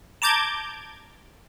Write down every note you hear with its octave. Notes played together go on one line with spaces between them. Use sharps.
A5 A#5 D6 G6 G#6